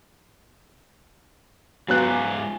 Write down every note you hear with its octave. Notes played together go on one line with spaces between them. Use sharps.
G#2 F#3 B3 F4 C5 G#5 F#6